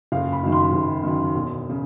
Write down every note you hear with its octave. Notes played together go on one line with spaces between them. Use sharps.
F#1 F5
B5
F#2 D#3
C6
F#1
F#2 D#3
E1
C#3